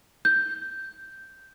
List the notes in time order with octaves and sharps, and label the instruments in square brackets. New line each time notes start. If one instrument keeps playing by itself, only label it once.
[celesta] G6